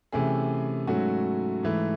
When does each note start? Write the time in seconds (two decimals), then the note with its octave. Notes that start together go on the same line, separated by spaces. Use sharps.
0.12 C3 E3 A3 C#4 G#4
0.87 G#2 F#3 A3 C#4 F#4
1.63 G#2 E3 A3